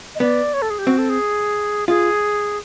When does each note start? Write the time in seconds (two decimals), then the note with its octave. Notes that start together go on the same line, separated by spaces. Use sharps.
0.15 D#5
0.20 B3 D5
0.54 C#5
0.62 A4
0.70 G#4
0.79 G4
0.87 C4 F#4
0.98 A4
1.10 G#4
1.88 F4 G#4